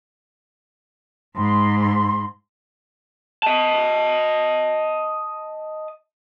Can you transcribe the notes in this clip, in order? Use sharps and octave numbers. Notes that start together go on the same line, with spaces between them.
G#2 B5 C6
D#5 A5